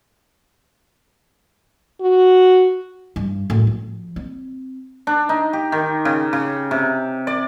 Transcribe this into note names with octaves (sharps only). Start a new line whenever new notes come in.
F#4
G2
F#2 A2
F3
C4
D4
D#4
G4
D#3
C#3
C#3
C3
D5